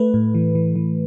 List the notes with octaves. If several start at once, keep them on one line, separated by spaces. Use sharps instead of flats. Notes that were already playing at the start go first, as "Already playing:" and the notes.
Already playing: A3 B4
A2
E3
E3
E3